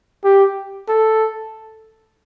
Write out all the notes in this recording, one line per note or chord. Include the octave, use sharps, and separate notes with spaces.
G4
A4